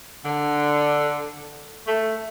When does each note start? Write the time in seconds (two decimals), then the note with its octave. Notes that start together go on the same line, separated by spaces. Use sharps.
0.24 D3
1.87 A3